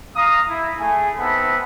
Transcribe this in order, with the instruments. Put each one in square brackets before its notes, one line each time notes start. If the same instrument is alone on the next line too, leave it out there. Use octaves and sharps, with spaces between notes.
[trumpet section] F5 A#5 D#6
E4
A3 G#4 G#5
B3 C4 D#4 E5 A5 B5